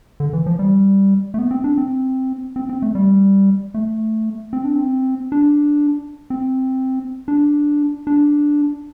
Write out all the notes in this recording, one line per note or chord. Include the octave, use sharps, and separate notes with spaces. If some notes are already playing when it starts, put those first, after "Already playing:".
D3
E3
F3
G3
A3
B3
C4
D4
C4
C4
C4
A3
G3
A3
C4
D4
C4
D4
C4
D4
D4